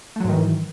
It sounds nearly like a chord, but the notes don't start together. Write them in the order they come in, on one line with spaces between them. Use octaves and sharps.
A3 F#3 G#2 D#3 E3